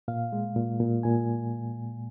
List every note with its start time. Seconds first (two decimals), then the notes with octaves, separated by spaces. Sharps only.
0.08 A#2 F5
0.33 G#3
0.56 A#2
0.80 A#2
1.03 A#2 G#5